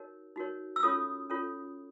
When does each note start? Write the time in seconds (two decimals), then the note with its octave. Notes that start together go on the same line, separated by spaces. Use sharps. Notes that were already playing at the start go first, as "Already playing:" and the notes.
Already playing: D#4 F#4 A#4 C#5
0.36 D#4 F#4 A#4 C#5
0.76 E6
0.83 C#4 F4 A4 C#5 D#6
1.30 C#4 F4 A4 C#5